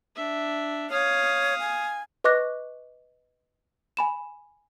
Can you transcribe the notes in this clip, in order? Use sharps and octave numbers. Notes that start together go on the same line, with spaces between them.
D4 E5
C#5 F5 D#6
G#5
B4 D#5 C#6 D6 F#6 A#6
G#5 B5 E7